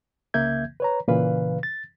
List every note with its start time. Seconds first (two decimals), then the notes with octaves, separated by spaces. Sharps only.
0.34 C2 C#3 A#3 E5 G6 G#6
0.80 B4 C#5 A#5
1.08 A#2 C#3 E3 B4 F5
1.63 A6